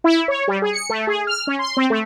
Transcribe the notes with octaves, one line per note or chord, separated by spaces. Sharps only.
E4
C#5
G3
G#4
C#7
A3
G#4
F6
C#4
C6
C4
A3